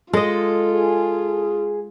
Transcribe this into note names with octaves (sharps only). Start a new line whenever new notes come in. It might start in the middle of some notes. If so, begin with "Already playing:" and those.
G#3 F4 A4 D#5
G#4